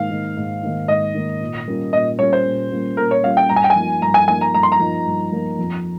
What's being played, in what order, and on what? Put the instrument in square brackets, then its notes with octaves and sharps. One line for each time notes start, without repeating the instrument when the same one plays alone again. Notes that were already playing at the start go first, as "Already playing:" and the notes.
Already playing: [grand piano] G#2 D#3 A#3 D#4 [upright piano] F5
[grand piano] D#3 A#3 D#4
G#2
D#3 A#3 D#4
[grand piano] G#2 [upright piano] D#5
[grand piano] D#3 A#3 D#4
A#2
G3 A#3 C#4 F4
[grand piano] A#2 [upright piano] D#5
[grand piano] G3 A#3 C#4 F4 [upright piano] C#5
[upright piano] C5
[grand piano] A#2
G3 A#3 C#4 F4
[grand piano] A#2 [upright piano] A#4
[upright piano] C#5
[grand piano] G3 A#3 C#4 F4 [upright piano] F5
[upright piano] G5
[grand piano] G2 [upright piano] A#5
[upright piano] G#5
G5
G#5
[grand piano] F3 A#3 D#4
[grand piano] G2 [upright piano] A#5
[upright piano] G#5
[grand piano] F3 A#3 D#4 [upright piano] G#5
[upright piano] A#5
[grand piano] G2 [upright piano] A#5
[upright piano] C6
A#5
[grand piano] F3 A#3 D#4
G2
F3 A#3 D#4
F2